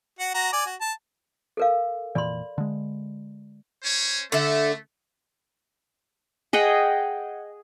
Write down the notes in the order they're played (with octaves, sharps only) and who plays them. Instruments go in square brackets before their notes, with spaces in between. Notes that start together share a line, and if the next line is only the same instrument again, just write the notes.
[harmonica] F#4 F#5
F#4 A#5
D5 G#5
F#4
A5
[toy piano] A4 A#4 F5
[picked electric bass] F1 A#2 E3 [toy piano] D5 B5 C6
[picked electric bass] D3 G#3
[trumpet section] C#4 C5 C#5
[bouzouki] D3 E5 [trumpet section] A3
[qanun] G#4 D#5 F#5 G5